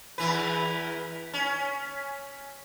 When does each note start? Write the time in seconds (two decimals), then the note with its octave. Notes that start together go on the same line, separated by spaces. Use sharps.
0.18 E2 E3 B4
1.33 C#4